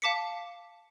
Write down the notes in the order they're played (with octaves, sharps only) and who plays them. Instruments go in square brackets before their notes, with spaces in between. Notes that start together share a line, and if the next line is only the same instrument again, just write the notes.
[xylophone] F5 A5 D6 B6 C#7